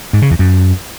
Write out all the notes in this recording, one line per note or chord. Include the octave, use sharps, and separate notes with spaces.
G#2
C#3
E2
F#2